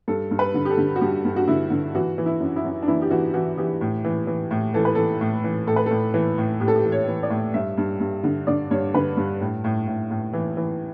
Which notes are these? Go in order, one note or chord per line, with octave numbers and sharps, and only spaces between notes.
G2 A4
G2
B4
D3
G4
A4
D3
F#4
G2 G4
G2
F#4
D3 E4
D3
E3 F#4
E3
E4
F#2
E4
F#2
D4
E3 E4
G4
E3 F#4
E3 F#4
E3 G4
A2
E3
E3
A2
E3 A4
B4
E3 A4
A2
E3
A2 A4
B4
A2 A4
E3
A2
A2 G4
A4
G4
E3
C#5
E3
D5
A2
G2 E5
G2
G2
D3
D3 D5
G2 C#5
D3 B4
G2
A2
A2
A2
A2
E3
E3